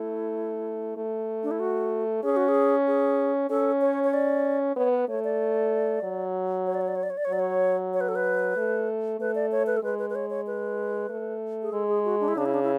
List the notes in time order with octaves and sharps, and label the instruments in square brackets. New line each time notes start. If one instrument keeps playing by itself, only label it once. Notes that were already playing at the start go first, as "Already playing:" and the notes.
Already playing: [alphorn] A3 [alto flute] E4
[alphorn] A3
[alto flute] D4
E4
F#4
[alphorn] C#4 [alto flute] G#4
[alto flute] F#4
G#4
G#4
[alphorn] C#4 [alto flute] A4
[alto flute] C#5
C#5
D5
[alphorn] B3 [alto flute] C#5
[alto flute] B4
[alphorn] A3 [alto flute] C#5
[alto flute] D5
[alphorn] F#3
[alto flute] C#5
D5
C#5
D5
C#5
D5
C#5
D5
C#5
[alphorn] F#3 [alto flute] D5
[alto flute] C#5
C#5
B4
A4
B4
[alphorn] A3
[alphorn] A3 [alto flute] B4
[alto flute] D5
C#5
B4
A4
[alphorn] G#3 [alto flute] B4
[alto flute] B4
B4
C#5
C#5
B4
[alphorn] A3
[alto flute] G#4
[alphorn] G#3 [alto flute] A4
[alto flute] G#4
F#4
D4
E4
[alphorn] C#3 [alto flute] D4
[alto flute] E4
D4
E4